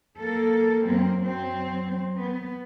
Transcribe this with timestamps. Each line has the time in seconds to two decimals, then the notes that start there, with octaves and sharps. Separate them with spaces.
0.20 A#3 A4
0.83 F#2 A#3 C4
1.23 F#3 C4
2.22 B3